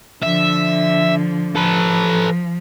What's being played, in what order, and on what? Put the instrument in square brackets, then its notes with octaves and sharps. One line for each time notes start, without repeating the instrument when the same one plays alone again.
[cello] D3 F3 [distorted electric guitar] E5
[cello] F3 [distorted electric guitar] A4 B4